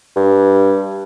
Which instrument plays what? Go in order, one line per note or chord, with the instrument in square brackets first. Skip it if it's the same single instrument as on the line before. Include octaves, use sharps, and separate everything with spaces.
[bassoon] G2